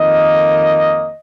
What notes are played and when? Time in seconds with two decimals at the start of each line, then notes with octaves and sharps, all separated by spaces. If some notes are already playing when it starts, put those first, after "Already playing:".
Already playing: F2 D#3 A#3 D#5